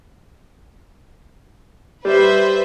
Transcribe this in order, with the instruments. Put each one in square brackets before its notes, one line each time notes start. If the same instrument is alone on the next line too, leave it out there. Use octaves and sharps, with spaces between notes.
[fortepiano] G3 [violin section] B4 C5 E5